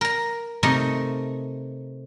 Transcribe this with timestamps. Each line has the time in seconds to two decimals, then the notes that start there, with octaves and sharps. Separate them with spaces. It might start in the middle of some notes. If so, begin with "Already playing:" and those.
0.01 A#4 A#5
0.63 C3 A3 D#4 A#4